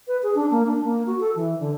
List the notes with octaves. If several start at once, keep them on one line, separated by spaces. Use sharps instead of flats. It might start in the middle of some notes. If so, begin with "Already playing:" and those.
B4
G#4
D4
A#3
D4
A#3
F#4
A4
E3
D3